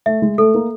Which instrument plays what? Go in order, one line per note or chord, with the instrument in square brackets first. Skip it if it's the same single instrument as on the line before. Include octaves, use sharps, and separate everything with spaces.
[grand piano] A3 [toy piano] E5
[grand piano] G#3
[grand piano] A3 [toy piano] A4
[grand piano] A#3